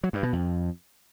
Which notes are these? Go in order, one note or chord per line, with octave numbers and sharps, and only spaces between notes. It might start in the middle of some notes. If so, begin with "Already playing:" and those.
F#3
G2
B2
F2